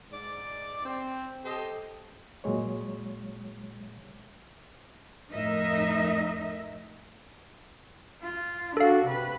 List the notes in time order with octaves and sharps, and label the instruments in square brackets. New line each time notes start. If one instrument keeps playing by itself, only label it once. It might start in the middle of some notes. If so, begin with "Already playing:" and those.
[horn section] G#2 D5
C4
G4 A4 C5 D#5
[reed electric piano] A#2 F#3 G#3 C#5
[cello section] F2 A2 D#4 A#4 D#5 E5
[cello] F4
[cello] D4 F#4 [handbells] A4 F5
[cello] C3 B4